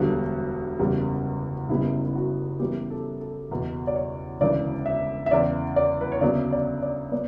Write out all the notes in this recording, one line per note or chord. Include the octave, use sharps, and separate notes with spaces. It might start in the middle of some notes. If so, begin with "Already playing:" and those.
Already playing: E1 D2 D3 G3 B3 F#4
F#1 E2 C#3 G3
F#1 F#2 C#3 G3 B3 E4
E4
F#4
F#2 E3 G3 B3 G4
A4
A4
F#1 E2 B2
D5
C#5
E1 D2 C#3 E3 D5
E5
E5
E2 C#3 E3 D5
D5
B4
C#5
D2 C#3 F#3 B3 D5
D5
D5
B3 D5